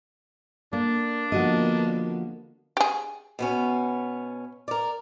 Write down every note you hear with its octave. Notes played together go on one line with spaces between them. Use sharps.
A#3 D4
D3 F3 A#3 B3 F#4 D#5
G4 G#4
B2 B3 C#4
A#4 D5